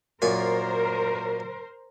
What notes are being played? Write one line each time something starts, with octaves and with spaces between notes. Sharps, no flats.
F#2 A#2 A#4 C5 G#5